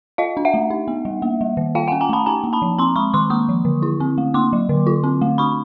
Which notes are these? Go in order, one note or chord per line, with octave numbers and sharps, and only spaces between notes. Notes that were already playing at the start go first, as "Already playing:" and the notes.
F4 D#5 F5
D4
E5 F#5
A3
D#4
B3
G3
A#3
G3
D#3
F4 F5 G5
C#4 F#5 G#5
G#5 A#5
A3 A5 B5
D#4 G#5 A#5
A#3
A5 B5
F3
C4 A#5 C6
G#3 B5 C#6
D#3 C6 D6
A#3 C#6 D#6
F3
D3
E4
C4
A3
A#3 C6 D6
F#3
D3
F4
C4
A3
D4 B5 C#6